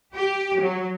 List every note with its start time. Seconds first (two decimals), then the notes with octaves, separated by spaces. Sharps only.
0.14 G4
0.59 F#3